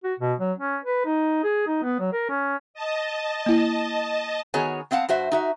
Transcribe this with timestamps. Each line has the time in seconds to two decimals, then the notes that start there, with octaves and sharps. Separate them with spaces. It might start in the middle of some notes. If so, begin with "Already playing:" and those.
0.04 F#4
0.20 B2
0.40 F#3
0.59 C#4
0.84 B4
1.05 D#4
1.43 G#4
1.67 D#4
1.83 B3
1.99 F#3
2.13 A#4
2.29 C#4
2.74 D#5 A5
3.46 A#3 E4
4.54 D#3 B3 F#4 G#4 C#5 G#5
4.91 B3 C4 F5 F#5 A5
5.09 G2 F#4 C5 E5
5.32 D#4 F#4 E5